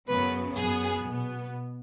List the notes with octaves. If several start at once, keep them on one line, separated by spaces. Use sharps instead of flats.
F#2 C#3 F#3 B3 B4
F#2 F#3 B3 G#4
B2 B3